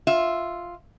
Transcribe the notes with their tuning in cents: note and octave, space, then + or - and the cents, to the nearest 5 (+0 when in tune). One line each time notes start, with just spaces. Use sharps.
F4 +0 E5 +0